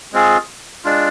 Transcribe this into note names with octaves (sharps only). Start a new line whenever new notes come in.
G#3 C4 F4 G#4
G#3 D4 F4